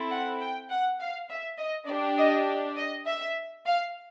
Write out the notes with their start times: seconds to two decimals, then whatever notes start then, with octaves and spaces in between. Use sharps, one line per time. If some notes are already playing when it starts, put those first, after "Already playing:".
Already playing: C4 E4 A4
0.11 F#5
0.41 G5
0.70 F#5
1.00 F5
1.29 E5
1.58 D#5
1.88 D4 G4 D5
2.18 D#5
2.77 D#5
3.06 E5
3.66 F5